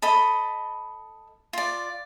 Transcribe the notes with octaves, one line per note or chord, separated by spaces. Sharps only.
A4 D#5 B5
F4 D5